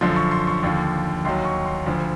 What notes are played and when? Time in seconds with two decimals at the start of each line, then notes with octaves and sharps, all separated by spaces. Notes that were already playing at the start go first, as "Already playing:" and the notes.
0.01 F#2 D3 F3 C6
0.16 C#6
0.31 C6
0.47 C#6
0.63 D#2 D3 F3
1.25 D#2 D#3 F#3 C6
1.45 C#6
1.66 C6
1.86 D2 D3 F3